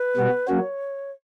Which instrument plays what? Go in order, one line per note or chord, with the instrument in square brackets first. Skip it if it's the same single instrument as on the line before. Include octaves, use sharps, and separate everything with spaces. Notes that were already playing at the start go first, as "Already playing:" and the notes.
Already playing: [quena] B4
[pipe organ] B2 G3 B3 F#4
[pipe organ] F#3 A#3 C#4 F#4 [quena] C#5